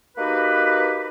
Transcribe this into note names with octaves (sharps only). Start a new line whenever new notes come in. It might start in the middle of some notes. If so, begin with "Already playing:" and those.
A#3 D#4 F#4 G4 B4